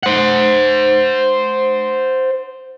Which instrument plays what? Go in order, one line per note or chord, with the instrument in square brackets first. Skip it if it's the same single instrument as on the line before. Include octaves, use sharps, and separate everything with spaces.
[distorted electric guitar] C5 F#5